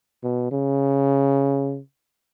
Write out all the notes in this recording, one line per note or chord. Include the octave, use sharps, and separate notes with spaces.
B2
C#3